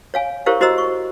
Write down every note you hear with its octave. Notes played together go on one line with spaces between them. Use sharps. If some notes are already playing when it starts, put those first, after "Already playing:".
C#5 F5 G#5
E4 G4 A#4 C5 C#5 F5
E4 F#4 C5 D#5 A#5 E6
C#6